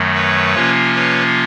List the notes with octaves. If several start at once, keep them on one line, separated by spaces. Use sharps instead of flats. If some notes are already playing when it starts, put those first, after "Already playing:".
Already playing: F#2 D#3 F#3 A3
B4 C#5
C3 F3 A#3 C#4 F4
B4 C#5